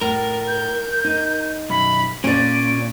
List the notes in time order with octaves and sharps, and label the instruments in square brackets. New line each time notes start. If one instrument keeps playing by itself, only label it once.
[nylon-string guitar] A2 [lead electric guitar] A#4
[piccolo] G6
[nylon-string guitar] D#4
[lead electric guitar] B1 F#2 [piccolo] B5
[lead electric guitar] A#2 [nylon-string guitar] C#4 D5 [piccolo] D7